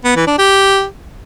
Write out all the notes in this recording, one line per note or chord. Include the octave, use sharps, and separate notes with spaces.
B3
E3
D4
G4